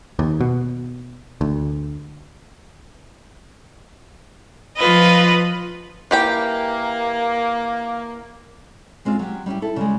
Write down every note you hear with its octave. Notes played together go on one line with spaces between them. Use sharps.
D#2
B2
D2
F3 F4 B4 D#5
E3 A#3 G4 G5
G#3 C4 C#4 F4
F#3 G4
G3 C#4 E4 G4
E4 A4
C#3 G3 G#3